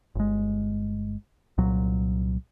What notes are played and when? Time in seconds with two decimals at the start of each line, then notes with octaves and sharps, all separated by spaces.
0.15 G1 G#3
1.58 C2 A#2 F#3